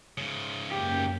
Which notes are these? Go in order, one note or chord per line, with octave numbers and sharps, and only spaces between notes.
G#2 C#3
F#2 A#3 C#4 G4